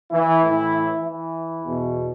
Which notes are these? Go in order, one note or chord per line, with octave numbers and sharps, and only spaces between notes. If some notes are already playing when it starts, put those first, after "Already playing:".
E3 E4
A2 E3
E3 E4
E2 B2